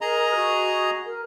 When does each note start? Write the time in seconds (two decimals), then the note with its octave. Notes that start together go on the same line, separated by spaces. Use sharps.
0.01 G#4 A#4 D#5 A#5
0.36 F#4
1.06 A#4